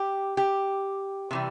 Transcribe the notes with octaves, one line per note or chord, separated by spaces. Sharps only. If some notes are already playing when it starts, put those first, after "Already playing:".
Already playing: G4
G4
C3 E3 G3